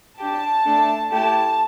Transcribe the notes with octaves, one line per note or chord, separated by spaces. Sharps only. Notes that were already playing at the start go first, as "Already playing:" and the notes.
D4 G4 A5
A3 D4 A4
A3 E4 G4 A5